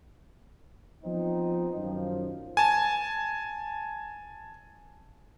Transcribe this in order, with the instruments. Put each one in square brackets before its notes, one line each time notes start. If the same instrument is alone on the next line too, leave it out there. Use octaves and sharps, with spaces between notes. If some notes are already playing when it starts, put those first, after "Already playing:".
[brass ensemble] F3 B3 C4 D#4
F#2 D#3 F3
[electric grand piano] G#5 A5